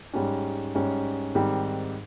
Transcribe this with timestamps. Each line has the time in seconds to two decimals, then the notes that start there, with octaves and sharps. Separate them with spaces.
0.13 G#2 G3 C#4
0.75 G#2 G3 C#4
1.35 G#2 D#3 G3 C4 G4